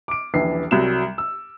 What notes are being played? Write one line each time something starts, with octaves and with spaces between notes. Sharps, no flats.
D6 D7
D#1 A#1 E3 C7
C2 F#3 G3 E7
E6